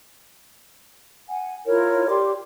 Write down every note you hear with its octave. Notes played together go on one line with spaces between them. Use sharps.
F#5 G#5
E4 F4 A#4 C#5
G4 D5 C6 D6